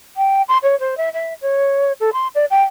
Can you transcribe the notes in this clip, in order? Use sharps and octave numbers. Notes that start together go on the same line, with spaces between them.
G5
C6
C#5
C5
E5
E5
C#5
A4
C6
D5
G5